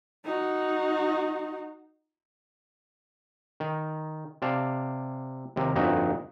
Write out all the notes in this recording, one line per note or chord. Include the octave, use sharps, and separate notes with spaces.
D#4 F#4
D#3
C3 D5 F5 A5
D#2 C3 A#4
G1 F2 A#2 D#4 F#4 D#5